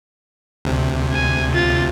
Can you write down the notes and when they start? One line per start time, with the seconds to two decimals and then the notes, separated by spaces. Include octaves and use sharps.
0.65 D2 C3
1.13 G#5
1.54 F4 A6